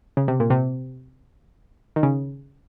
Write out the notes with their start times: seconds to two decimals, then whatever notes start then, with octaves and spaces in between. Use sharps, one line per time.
0.17 C#3
0.28 C3
0.40 A#2
0.50 C3
1.96 D#3
2.03 C#3